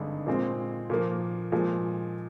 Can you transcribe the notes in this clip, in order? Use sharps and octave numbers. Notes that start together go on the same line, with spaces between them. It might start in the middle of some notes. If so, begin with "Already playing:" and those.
Already playing: G#1 G2 D3 G#3 D#4
A#2 G#3 C4
A#2 F3 A#3
A#2 F3 G#3